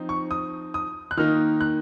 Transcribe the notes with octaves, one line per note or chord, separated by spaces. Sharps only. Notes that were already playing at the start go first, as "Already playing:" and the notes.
Already playing: F3 C4 D#4
C#6
D#6
D#6
F#6
D#3 A#3 D#4 F6
F#6